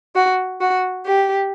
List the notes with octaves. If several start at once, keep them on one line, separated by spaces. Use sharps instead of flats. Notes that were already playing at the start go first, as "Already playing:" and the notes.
F#4
F#4
G4